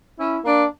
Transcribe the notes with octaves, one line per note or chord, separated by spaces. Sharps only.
C#4 E4
A#3 D4